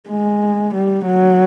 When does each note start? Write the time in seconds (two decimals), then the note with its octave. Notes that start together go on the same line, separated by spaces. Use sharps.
0.09 G#3
0.74 G3
1.06 F#3